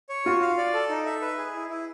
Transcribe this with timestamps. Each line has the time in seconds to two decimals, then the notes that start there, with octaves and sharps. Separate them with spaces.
0.09 C#5
0.26 F4 F#4
0.41 F5
0.57 D5
0.74 A4
0.89 D#4
1.06 E5
1.21 B4
1.38 G#4
1.54 E4
1.70 E4